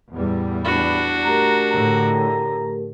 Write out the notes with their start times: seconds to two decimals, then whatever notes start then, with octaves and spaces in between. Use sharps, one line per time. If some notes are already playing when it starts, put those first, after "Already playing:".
0.13 E2 A2 G3
0.65 D4 F#4 B5
1.24 A3 G4 A#4 A#5
1.71 A2 D3 A#5